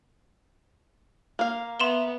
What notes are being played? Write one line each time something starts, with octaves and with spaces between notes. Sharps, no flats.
A#3 F5
B3 E5 C6 E7 G7